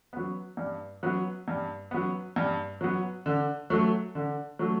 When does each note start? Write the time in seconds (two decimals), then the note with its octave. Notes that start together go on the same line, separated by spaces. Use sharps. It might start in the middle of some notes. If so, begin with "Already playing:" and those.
0.13 F#3 B3
0.57 G2
1.03 F#3 B3
1.48 G2
1.91 F#3 B3
2.36 G2
2.81 F#3 B3
3.26 D3
3.70 F#3 A3
4.15 D3
4.59 F#3 A3